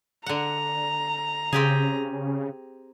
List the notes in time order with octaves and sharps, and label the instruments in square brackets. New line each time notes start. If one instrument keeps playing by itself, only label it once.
[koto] D3 F#5 [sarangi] A#5
[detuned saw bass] C#3 [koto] C4 G4 G#4